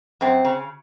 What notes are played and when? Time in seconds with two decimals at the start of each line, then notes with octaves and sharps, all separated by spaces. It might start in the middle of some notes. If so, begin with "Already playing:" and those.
0.21 F#2 C4
0.45 C#3